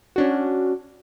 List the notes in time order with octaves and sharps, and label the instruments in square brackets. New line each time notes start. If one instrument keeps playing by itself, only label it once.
[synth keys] C#4 D4 F#4